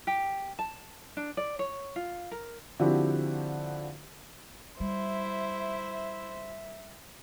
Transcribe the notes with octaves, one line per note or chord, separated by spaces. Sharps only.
G4
A5
D4
D5
C#5
F4
A#4
D3 F3 C4 E4 F#4 G4
G3 E4 C5 E5